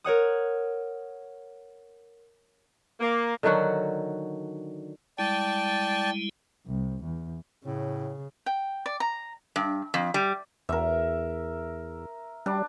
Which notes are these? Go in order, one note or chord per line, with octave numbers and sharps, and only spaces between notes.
A#4 C#5 F#5 D#6
A#3
D3 D#3 F#3 F#4
G3 G#3 E4 D5 G5 A5
C2
E2
A2 C#3
G5
D5
A#5
G2
F2
G3
E2 A#4 E5
G3 D4